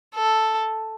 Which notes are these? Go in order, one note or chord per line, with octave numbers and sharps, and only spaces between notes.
A4